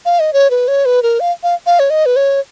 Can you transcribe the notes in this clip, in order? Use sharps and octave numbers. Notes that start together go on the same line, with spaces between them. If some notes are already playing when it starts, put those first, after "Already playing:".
F5
D#5
C#5
B4
C#5
B4
A#4
F5
F5
F5
C#5
D#5
B4
C#5